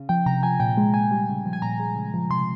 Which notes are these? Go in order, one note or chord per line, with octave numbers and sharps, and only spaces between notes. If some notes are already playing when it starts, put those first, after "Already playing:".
Already playing: C#3
F3 G5
C3 A#5
F3 G#5
A#2 G5
G#3
A#2 G#5
G3
C#3
F3
G#5
A#2 A#5
G#3
C#3
F3
C3 C6